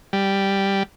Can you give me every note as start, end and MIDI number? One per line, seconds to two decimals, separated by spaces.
0.13 0.83 55